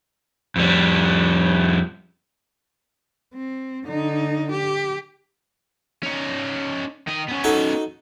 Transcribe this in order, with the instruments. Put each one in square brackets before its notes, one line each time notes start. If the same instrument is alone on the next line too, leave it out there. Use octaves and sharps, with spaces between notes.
[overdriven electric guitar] F2 G3
[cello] C4
D3 D#4
G4
[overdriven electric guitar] C#4 D#4
D#3 D#5
B3 C#4
[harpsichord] D#4 F#4 A4